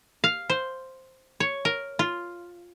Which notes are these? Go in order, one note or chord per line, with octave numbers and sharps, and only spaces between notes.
F5
C5
C#5
A#4
F4